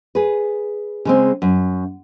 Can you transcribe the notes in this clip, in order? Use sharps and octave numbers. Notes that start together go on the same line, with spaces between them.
G#4 B4
C#3 G#3 C4
F#2